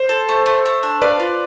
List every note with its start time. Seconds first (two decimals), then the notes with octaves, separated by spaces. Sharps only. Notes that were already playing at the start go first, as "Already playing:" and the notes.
Already playing: C5
0.09 A4
0.29 A3
0.46 A3
0.66 A3
0.83 D4
1.02 B4 D5 F5
1.20 F4